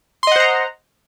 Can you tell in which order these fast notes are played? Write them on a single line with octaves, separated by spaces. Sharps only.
C6 D#5 F#5 C5 A#5